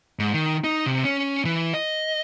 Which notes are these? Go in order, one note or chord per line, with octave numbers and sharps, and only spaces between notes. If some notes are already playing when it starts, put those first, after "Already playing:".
G#2
D#3
D#4
C3
C#4
E3
D#5